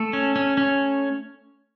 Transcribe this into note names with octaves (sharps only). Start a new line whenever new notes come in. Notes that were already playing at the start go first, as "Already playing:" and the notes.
Already playing: A3 A4
C#4
C#4
C#4